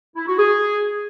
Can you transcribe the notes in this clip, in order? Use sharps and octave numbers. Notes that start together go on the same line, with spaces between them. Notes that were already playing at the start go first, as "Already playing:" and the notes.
E4
F#4
G#4